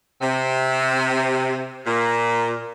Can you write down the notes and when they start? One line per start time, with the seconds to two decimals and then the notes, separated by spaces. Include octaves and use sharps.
0.21 C3
1.86 A#2